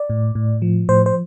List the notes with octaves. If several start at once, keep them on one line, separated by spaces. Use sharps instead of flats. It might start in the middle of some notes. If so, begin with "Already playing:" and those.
Already playing: D5
A2
A2
F3
A2 C5
C5